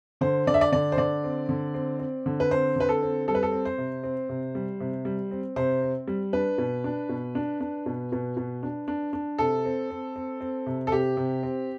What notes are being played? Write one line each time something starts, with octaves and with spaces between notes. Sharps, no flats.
D3 C5
D3 D5
E5
D5
D3 D5
C5
D3 D5
C4
D3
C4
C4
D3
B4
C4 C5
D3 B4
A4
C4
G3 A4
B4
A4
C4
C5
C3
C4
C3
G3
C3
G3
C4
C3 C5
C4
G3
D4 B4
B2
D4
B2
D4
D4
B2
B2
B2
D4
D4
D4
C3 A4
C4
C4
C4
C4
C3
A4
C3 G4
C3
C4